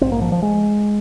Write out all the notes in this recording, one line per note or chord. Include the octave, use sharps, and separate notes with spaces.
A#1 G#2 C4
A#3
F3
F3
G#3